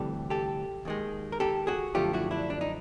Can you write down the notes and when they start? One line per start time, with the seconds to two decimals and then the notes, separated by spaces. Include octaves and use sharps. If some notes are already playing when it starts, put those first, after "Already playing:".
Already playing: D2 C3 E3 G3 G4 A4
0.30 G4 A4
0.85 D#2 D#3 G#3
1.32 A#4
1.40 G4 A4
1.67 F#4 G#4
1.95 F#2 D3 F3 A3 F4 G4
2.13 E4 F#4
2.31 D4 E4
2.50 D4
2.61 D#4